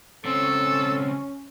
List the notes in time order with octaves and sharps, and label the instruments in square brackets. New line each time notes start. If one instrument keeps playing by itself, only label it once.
[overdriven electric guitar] C#2 C4 [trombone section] C#4 [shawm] A4